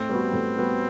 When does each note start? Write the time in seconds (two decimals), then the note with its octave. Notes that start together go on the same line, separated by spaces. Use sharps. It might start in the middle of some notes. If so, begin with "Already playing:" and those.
Already playing: A2 C4
0.09 G3 B3 F#4
0.33 A2
0.58 G3 B3 F#4